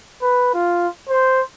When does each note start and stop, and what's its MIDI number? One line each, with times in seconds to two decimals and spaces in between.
0.22 0.52 71
0.54 0.88 65
1.09 1.42 72